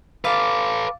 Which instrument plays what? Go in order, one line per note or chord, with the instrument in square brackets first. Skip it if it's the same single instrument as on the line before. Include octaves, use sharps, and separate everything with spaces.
[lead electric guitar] A4 B4 [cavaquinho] D5 F5